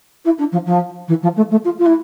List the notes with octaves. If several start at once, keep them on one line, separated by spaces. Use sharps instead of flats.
E4
D4
F3
F3
E3
F3
A3
A3
F4
F4
E4